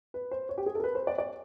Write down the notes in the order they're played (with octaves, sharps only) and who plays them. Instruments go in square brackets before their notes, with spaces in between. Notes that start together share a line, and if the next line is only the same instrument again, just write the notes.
[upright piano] B4
C5
C#5
G4
G#4
A4
A#4
B4
C5
D5
D5